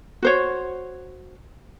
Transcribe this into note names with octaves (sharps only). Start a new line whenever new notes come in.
F#4 C5 C#5